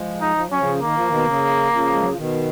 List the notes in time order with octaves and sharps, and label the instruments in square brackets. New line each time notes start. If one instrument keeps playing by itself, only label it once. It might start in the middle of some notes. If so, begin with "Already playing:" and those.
Already playing: [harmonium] F3 G#3
[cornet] D#4
[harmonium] F3
[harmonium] F#3 [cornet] C#4
[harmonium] C#3 F3
[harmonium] D#3 [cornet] A#3
[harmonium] F3
B2 D#3
C#3
C#3 F3
G#3
F#3
F3
B2 D#3